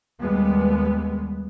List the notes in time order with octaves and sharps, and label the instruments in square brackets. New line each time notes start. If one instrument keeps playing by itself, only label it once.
[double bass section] D#2 G3 G#3 B3